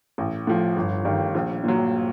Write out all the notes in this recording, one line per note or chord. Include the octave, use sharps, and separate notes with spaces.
A1
A2 F3
G1
G2 D#3
A#1
A#2 F#3